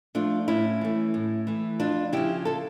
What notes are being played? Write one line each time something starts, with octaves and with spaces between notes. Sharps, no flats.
F3 A3 D4 F4
A2 C#4 E4
E3 A3
A2
E3 A3
F2 D4 F4
C#3 F3 E4 G4
F4 A4